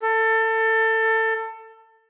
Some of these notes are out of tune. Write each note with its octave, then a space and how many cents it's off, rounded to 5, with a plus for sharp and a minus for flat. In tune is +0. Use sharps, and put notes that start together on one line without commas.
A4 +25